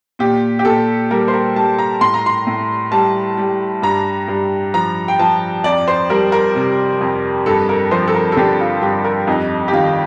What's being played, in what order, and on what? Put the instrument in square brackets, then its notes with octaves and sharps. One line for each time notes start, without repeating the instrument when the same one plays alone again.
[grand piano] A#2 G4
G4
A#2 A4
G3 A#4
C5
A#4
G3 A5
A#5
A2 C6
A#5
C6
A2
G3 A5
G3
G2 A#5
G2
F3 A#5
G5
F3 A5
F2 D5
C5
G3 A#4
A#4
C3
F2
G2 A4
A#4
F3 C5
A4
A#4
A4
D3 G4
F4
G2 G4
A#4
F2 D#4
G4
D#3 F4